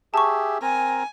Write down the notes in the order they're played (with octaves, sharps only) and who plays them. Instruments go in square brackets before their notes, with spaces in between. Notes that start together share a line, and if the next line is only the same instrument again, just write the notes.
[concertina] G4 G#4 E5 [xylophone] A5 C#6
[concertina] C4 A#4 A#5 [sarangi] G#5